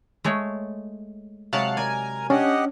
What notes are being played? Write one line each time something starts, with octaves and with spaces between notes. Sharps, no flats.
G#3 A3 C#5
C3 F#3 G#3 F5 F#5 A5
A#4 D5 G#5 A#5
C#4 D4 G4 D#5 F#5